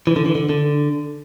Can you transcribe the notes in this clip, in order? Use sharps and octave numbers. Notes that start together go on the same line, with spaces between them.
E3
D3
E3
D3
D3